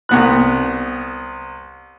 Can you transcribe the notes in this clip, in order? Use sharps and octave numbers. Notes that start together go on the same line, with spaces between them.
C2 B3 F#6